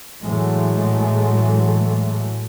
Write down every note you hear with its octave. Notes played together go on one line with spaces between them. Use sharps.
A2 E3 F#3 G#3 A3